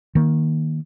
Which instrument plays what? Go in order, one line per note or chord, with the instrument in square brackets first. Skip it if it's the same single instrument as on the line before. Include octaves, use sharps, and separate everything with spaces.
[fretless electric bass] D#3 A#3